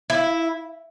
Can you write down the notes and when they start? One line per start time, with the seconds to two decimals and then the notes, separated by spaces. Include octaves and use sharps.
0.10 E4